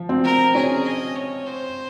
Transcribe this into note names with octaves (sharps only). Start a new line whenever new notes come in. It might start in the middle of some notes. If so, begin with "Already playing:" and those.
Already playing: F3
C4
A#4
C#4 G#4
D#5
C#5
C5